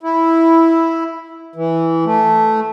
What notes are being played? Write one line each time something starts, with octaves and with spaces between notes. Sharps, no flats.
E4
E3
A3